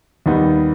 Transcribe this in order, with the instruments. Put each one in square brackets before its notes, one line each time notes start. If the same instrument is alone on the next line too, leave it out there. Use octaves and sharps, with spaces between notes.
[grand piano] D#2 D#3 G3 B3 D#4